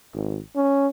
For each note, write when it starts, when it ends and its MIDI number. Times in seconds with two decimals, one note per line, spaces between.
0.14 0.40 32
0.56 0.87 61